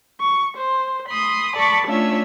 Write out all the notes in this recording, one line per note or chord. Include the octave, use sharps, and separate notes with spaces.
C#6
C5
B5 C6 D#6
A4 D5 A5 B5 C#6 D6
A3 C#4 D4 F4 C#5 E5